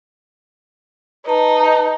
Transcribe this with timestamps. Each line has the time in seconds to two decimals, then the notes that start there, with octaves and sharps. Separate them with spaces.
1.26 D#4 B4 A5